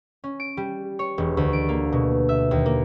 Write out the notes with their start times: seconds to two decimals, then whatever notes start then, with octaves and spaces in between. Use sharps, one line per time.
0.24 C#4
0.40 D7
0.57 G3
0.99 C#5
1.18 E1
1.37 D2
1.53 D7
1.69 A#3
1.92 B2
2.29 E5
2.51 D#2
2.66 A#3